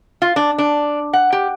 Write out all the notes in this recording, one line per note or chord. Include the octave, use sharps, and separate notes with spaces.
F4
D4
D4
F#5
G4